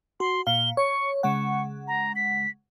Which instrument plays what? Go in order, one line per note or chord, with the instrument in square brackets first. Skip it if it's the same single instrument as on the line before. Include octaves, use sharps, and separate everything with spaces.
[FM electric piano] F#4 [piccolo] C6
[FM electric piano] A#2 F5 [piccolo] G7
[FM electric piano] C#5 [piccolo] C#6
[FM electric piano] C#3 G#3 F#5 [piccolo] C#6
[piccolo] A#5
B6